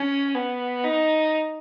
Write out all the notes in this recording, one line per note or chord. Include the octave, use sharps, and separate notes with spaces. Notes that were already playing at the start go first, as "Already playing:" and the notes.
Already playing: C#4
B3
D#4